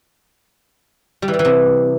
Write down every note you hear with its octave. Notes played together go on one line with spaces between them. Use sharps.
G3
E3
G3
E3
C3